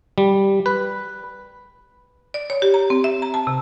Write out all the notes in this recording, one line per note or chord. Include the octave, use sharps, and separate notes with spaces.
G3
B4
D5
C#5
G4
A#5
C4
E5
A#5
A5
C3